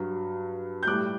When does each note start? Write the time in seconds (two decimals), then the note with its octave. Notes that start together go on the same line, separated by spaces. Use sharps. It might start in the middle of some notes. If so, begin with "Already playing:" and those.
Already playing: G2 F#3
0.83 G6
0.87 A2 G3 D6 F#6